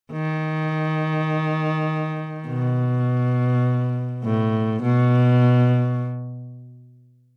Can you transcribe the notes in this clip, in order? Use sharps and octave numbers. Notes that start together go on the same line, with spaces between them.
D#3
B2
A2
B2